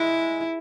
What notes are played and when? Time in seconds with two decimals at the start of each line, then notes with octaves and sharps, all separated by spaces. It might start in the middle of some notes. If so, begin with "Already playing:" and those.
Already playing: G#3 E4